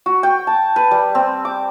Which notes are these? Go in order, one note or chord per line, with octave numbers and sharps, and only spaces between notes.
F#4
G5
A5
B4
G3
C4
D6